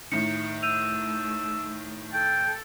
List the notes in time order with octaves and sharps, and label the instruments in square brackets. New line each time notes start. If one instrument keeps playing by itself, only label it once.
[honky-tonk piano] A2 D#3 [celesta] C#7
[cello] A3 [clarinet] E6 [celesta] G6 D#7 F7
[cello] A4 [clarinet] G5